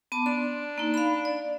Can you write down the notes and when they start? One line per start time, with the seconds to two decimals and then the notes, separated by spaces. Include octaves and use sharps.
0.12 B3 A5 D6
0.26 D4 C6
0.78 A#3 D#4
0.94 F5 B5
1.25 D5